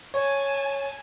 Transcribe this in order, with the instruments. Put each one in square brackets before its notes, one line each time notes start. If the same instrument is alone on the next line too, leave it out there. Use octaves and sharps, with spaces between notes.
[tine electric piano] C#5 [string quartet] G#5 A5